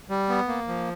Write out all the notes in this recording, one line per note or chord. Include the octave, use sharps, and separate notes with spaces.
G3
B3
A#3
F3